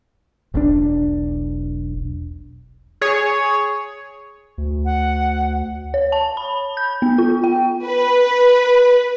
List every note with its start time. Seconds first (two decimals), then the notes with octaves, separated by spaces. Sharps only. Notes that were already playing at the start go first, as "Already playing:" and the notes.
0.54 E1 B1 A#2 D4
3.01 G#4 C#5
4.58 D2
4.85 F#5
5.94 C#5
6.12 A5
6.37 B5
6.77 G6
7.02 B3
7.18 F4
7.44 G5
7.86 B4